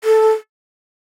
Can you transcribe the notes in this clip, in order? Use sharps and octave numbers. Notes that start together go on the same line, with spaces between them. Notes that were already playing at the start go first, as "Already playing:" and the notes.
A4